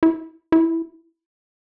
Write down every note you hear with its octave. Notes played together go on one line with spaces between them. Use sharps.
E4
E4